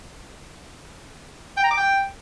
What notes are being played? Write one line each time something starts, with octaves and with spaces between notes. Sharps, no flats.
G5
A#5
D6
G5